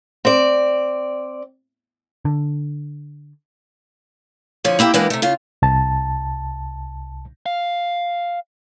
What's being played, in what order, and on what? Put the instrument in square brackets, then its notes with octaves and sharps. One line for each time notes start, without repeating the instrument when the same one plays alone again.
[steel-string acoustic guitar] C4 D5
[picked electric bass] D3
[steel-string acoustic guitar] D3 F3 C#5
A#3 E4 G4 G5
E3 G3 G#3 A#3 B3 D4
C3 A3
C#3 F4
[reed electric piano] C2 A5
[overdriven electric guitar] F5